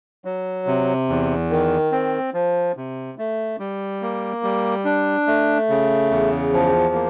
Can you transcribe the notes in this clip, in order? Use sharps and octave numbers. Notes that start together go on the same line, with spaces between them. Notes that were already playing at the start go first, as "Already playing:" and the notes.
F#3
C3
E2
D#3
C4
F3
C3
A3
G3
A#3
G3
D4
A3
C#3
E2
F3
A#3